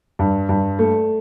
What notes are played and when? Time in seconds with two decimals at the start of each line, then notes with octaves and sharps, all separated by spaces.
0.19 G2
0.49 G2
0.79 A3